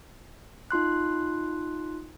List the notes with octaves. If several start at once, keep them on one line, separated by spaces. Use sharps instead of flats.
D#4 F4 C6 F#6